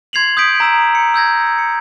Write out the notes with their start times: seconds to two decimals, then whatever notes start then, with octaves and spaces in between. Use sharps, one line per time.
0.13 C6 G#6 C7 F7 F#7
0.37 D#6 G6 B6 D7
0.60 A#5 E6 E7
0.95 C#7
1.14 E6 G6 G#6 A#6
1.58 C#7